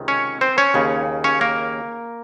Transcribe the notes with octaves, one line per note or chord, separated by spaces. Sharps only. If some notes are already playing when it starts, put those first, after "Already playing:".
Already playing: C#2 C3 D#3
C#4 C#5
C4 C5
C#4 C#5
D#2 C#3
C#4 C#5
A#3 A#4